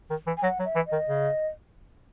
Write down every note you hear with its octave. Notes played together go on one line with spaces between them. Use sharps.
D#3
E3
G#5
F#3 F#5
F#3
E5
E3
D#5
D#3
C#3